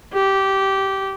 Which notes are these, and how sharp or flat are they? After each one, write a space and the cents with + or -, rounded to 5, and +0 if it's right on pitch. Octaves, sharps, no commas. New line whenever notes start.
G4 -15